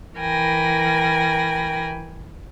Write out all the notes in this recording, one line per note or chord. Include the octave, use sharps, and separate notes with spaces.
E3 A#4 G5 G#5 B5 A#6